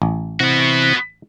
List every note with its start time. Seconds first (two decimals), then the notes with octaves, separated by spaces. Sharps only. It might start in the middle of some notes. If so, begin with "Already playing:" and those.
0.02 A1
0.40 C3 E3 B3 F#4